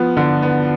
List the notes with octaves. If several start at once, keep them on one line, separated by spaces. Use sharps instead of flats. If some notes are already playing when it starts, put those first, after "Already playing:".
Already playing: F3 B3
D3
B3